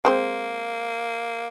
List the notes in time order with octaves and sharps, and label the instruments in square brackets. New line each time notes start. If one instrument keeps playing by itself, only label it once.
[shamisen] G#3 C4 C5 [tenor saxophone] A#3